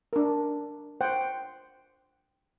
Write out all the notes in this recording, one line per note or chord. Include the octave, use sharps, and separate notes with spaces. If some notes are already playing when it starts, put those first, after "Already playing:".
D4 A#4
C5 F#5 G5